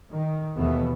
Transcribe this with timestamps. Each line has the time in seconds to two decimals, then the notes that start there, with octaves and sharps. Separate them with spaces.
0.11 D#3
0.56 D#2 B2 E3 A3 B3